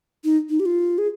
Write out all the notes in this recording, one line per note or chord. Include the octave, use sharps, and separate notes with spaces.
D#4
D#4
G4
F4
G#4